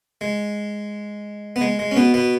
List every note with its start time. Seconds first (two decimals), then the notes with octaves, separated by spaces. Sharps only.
0.21 G#3
1.56 B3
1.61 G#3
1.79 G#3
1.91 C#4
1.96 B2 B3
2.14 B2 B3